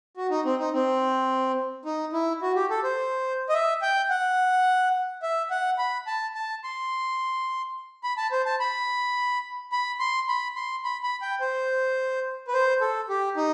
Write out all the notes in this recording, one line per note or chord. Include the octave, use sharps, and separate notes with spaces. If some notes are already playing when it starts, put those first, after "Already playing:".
F#4
D#4
C4
D#4
C4
D#4
E4
F#4
G4
A4
C5
D#5
E5
G5
F#5
E5
F#5
B5
A5
A5
C6
B5
A5
C5
A5
B5
B5
C6
B5
C6
B5
B5
G5
C5
B4
C5
A4
G4
D#4